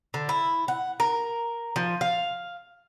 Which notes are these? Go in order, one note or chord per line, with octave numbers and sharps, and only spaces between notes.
D3
E4
F#5
A#4
F3
F5